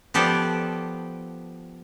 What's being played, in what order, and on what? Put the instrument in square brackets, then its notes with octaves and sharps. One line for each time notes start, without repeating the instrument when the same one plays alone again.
[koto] F3 B3 G4 A4 C5 D5